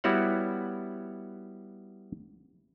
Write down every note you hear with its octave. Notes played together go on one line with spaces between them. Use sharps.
G3 B3 E4 F#4 C#5 F#5